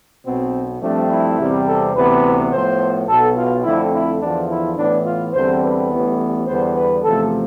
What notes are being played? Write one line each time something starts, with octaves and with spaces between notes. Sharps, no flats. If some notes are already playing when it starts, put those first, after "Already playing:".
B1 B2 B3 C4
G2 F3 A3 C4 D4
E4
E2 C3 G3 C4
A4
D2 C3 E3 B3 B4
A2 F3 B3 C5
B1 B2 B3 A4
F4
F2 D3 A3 C4 E4
E4
E2 D3 F3 D4
E4
A2 E3 B3 D4
F4
E2 D3 G3 C4 C5
B4
A1 A2 E3 G3 B3
E2 D3 G3 B3 C5
B4
E2 C3 F3 A3 A4